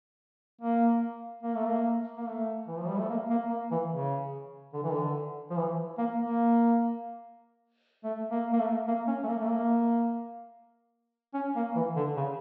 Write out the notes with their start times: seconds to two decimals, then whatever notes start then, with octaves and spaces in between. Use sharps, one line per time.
0.61 A#3
1.43 A#3
1.55 A3
1.66 A#3
2.17 A#3
2.27 A3
2.67 E3
2.78 F3
2.88 G3
2.99 A3
3.09 A#3
3.30 A#3
3.50 A#3
3.71 E3
3.92 C#3
4.73 D3
4.83 E3
4.92 D3
5.50 F3
5.57 E3
5.98 A#3
6.18 A#3
8.04 A3
8.31 A#3
8.53 A#3
8.59 A3
8.87 A#3
9.07 C#4
9.23 A3
9.28 A#3
9.41 A3
9.48 A#3
11.34 C#4
11.56 A#3
11.76 E3
11.96 D3
12.16 C#3